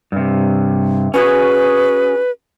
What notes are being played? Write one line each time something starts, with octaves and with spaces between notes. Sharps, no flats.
G2 C3
C#4 F#4 G#4 B4